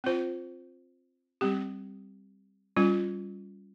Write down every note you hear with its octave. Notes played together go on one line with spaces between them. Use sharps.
C4 F4 C5
G3 C4 G4
G3 C#4 F4